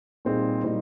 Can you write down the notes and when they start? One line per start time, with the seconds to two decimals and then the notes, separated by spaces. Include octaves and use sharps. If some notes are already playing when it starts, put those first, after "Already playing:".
0.25 A#2 G3 C4 D#4 G#4
0.63 A#2 G3 C4 D#4